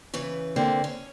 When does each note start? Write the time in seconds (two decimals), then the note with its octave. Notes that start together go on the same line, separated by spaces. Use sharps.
0.14 C#3 E3 B4
0.56 D3 A#3 C4
0.84 C#4